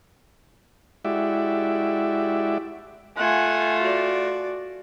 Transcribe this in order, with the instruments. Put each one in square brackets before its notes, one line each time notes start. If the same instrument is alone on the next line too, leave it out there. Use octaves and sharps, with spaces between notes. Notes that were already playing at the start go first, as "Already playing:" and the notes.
[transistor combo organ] G#3 E4 F#4 G4 D5 E5
[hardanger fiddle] A3 F4 [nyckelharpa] F#5 G#5
[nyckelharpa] F#4 D5